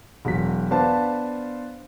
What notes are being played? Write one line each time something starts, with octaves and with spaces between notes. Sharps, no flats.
E1 F#3 B6
B3 D4 C5 F5 A5